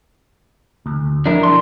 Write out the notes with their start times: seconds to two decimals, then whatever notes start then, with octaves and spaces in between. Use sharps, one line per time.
0.86 D2
1.26 F3 D4 E4 A#4
1.43 B1 A5 C6